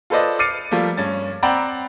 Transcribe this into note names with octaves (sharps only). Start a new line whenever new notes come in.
F4 A4 B4 C5 D5 D#5
D6 F6 A6 C7 C#7 D#7
F3 G3 A3 A#3
G2 C#4 A6
C4 D5 F#5 G5 A#5 B5